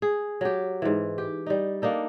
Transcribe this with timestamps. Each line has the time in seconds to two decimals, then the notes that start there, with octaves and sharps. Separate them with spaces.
0.02 G#4
0.41 F#3 G4
0.82 G#2 E3
1.18 G4
1.47 G3 D#4
1.82 A#3 D4 D#4 A4